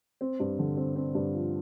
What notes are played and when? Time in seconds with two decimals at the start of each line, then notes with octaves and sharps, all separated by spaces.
0.21 C4
0.40 G2
0.59 D3
0.77 C4
0.96 C4
1.15 G2
1.33 F3